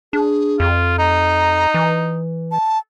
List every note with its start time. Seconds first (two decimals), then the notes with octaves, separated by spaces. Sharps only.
0.13 D4 G#4
0.60 F2 F4
0.99 D#4 A#5
1.74 E3
2.52 A5